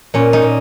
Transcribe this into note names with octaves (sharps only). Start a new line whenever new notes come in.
A#2 C#4
D#4
A#2